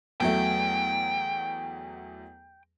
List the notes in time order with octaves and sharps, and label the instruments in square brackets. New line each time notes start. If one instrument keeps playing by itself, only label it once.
[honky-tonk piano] E2 F#3 A3 [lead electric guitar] G5